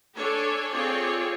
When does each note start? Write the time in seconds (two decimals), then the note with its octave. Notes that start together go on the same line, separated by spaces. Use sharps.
0.15 D4 A4 C#5 G#5
0.71 C4 F4 G#4 C#5 D5